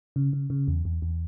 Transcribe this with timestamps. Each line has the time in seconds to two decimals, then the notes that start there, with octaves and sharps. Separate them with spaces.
0.16 C#3
0.33 C#3
0.50 C#3
0.68 E2
0.85 E2
1.02 E2